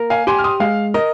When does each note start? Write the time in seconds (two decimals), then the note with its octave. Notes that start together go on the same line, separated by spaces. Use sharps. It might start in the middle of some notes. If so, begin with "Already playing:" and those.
Already playing: A#3 A#4
0.10 F5 G#5
0.27 G4 G#5 C6
0.38 F6
0.44 C6 D#6
0.60 G#3 F5
0.94 A#4 D#5